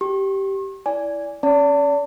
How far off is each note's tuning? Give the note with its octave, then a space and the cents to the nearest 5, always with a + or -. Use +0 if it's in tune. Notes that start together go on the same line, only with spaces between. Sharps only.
G4 -10 C#6 -45
E4 +0 D5 -20 G#5 +0
C#4 +0 D5 -35 A5 +30